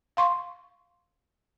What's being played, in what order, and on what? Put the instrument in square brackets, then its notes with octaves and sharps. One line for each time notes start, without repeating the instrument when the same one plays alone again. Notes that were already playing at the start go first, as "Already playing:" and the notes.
[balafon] F5 C6 C#6